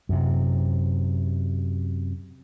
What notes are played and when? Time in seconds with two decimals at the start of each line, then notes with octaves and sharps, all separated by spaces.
0.09 F#2 C3